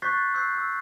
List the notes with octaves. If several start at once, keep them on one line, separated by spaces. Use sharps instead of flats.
C#6 F#6 G6 A6 B6 C7
E6 F#6 G6 C7
E6